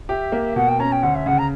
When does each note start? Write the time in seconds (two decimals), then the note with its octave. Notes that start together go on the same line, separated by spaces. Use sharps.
0.09 G4 E5
0.32 A#3
0.56 B2 F#5
0.68 G5
0.79 C#4 A#5
0.92 G5
1.03 D2 F#5
1.15 E5
1.26 C#3 F#5
1.38 A#5